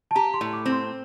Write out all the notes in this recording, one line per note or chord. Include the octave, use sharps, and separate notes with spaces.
A5
G4 A#5
C6
A2
D6
C4
C6